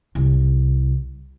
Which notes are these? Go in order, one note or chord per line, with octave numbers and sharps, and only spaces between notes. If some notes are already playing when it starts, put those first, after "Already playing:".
C2